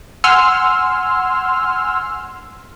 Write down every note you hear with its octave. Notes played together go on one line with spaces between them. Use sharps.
F#5 G#5 C6 E6 F6